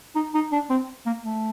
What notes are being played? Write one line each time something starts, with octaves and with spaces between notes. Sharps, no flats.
D#4
D#4
D4
C4
A#3
A3